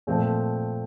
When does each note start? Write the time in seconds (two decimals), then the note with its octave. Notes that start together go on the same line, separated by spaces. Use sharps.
0.07 A#2 F3 A3 C4